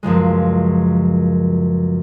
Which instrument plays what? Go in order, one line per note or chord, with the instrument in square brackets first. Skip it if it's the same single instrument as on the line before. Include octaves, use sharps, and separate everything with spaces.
[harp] C#2 F#2 F3 G#3